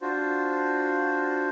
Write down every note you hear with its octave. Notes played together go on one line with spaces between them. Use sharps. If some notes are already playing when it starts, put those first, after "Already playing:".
D4 F4 F#4 C5